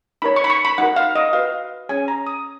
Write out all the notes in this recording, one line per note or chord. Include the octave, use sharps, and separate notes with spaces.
D#4 A#4 C#5 B5
C#6
B5
C#6
B5
D#4 F#4 A#4 F#5
F5
D#5
F#4 B4 F5
C#4 G#4 C#5 G#5
A#5
D#6